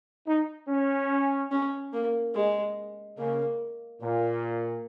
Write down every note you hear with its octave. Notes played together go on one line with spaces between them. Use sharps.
D#4
C#4
C#4
A#3
G#3
C#3 A#3
A#2 A#3